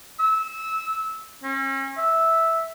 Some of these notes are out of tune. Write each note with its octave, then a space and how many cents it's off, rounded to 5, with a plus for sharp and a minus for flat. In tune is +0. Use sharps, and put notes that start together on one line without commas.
E6 -20
C#4 -40
E5 -10